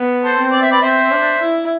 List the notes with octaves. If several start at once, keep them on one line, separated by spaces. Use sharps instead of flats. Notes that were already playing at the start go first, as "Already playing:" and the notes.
Already playing: B3
A4 C5
C4
D5
E5
B4 D5
C4 C5 E5
D4
E4